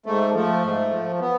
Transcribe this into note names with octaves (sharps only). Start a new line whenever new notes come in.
G#2 A3
F3 A3
G#2
F3
B3